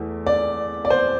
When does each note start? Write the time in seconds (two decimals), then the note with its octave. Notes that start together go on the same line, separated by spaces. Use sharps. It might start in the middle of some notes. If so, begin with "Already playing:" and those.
Already playing: E2 E3 A3
0.26 D5
0.85 D5
0.90 C5